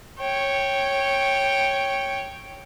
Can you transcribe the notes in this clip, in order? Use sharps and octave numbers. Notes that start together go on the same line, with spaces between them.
C#5 G5